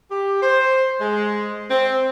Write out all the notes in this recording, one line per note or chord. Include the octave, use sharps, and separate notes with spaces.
G4
C5
G#3
C4